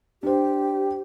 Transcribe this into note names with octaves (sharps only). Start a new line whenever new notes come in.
D4 G4 C5